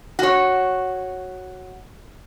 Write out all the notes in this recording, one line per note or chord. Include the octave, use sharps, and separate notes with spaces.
F#4 C#5